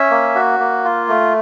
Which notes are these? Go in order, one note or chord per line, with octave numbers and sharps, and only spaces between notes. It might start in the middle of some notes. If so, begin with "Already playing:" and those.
Already playing: C#4 E5
A#3
F#4
A#3
F4
A3